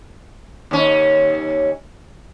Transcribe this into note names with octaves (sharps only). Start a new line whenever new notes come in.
D#2 C#4